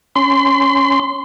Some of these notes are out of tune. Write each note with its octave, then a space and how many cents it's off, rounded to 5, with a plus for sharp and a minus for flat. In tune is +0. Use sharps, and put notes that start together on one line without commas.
C#4 +0 C6 -30